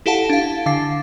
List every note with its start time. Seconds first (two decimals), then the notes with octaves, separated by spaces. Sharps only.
0.06 E4 G4 A4 F5 F#5 A5
0.30 D4 F5
0.66 D3 F5 A6 C7